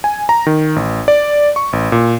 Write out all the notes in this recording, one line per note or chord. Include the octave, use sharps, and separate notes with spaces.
G#5
A#5
D#3
A1
D5
C#6
A1
A#2